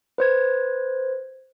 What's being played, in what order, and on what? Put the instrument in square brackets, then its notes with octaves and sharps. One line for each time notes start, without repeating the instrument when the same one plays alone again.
[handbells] B4 C5 G#6